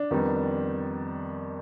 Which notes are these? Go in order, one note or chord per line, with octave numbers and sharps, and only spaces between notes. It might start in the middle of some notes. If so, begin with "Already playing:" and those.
Already playing: D4
F2 D#3 G3 B3